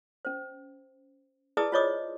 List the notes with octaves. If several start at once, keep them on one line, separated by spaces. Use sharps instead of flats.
C#4 C5
E4 G#4 B4 D5 A5 D#6
F4 C5 C#5 D#5 D6 D#6